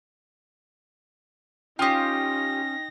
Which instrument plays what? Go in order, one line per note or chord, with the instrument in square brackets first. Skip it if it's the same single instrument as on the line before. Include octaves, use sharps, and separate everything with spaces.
[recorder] C#4 [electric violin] D#4 A#6 [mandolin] F4 G4 [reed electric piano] G5 D#6